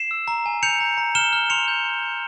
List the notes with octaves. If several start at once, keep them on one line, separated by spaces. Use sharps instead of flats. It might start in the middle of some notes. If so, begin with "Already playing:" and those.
Already playing: C7 E7
E6
A#5
G#5
G6 C#7 F7
A#5
A#5
F6 E7 G7
F6
C6 C#7 F7
G6
G6
G6